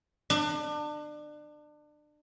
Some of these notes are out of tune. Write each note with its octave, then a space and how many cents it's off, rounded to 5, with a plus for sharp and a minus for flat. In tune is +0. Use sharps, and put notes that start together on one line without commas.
D4 +30